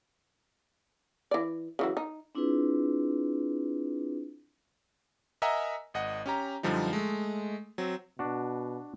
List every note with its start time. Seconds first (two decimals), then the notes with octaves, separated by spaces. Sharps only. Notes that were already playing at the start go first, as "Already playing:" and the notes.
1.31 E3 D5
1.79 C#3 E3 F#3
1.97 D#4
2.35 C4 D4 E4 F4 G#4 B4
5.42 A#4 D#5 E5 F#5 G#5 A#5
5.94 G#1 D#5 F#5
6.26 C#4 G4 A#5
6.63 F#2 D3 F3 G3 D#4
6.93 G#3 A3
7.78 F#3 C4
8.19 B2 D4 F#4